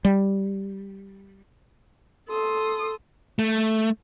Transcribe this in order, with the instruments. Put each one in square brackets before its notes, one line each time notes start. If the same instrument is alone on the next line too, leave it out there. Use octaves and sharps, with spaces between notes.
[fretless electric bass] G3
[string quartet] A4 C6 D#6
[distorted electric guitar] A3